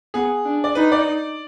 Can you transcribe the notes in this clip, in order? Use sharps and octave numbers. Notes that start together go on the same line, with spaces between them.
B3 G#4
D4
D5
D#4 B4
D5